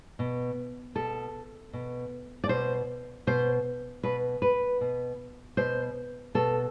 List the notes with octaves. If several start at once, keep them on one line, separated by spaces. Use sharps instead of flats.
B2
B2 A4
B2
D5
B2 C5
B2 C5
B2 B4
B4
B2
B2 C5
B2 A4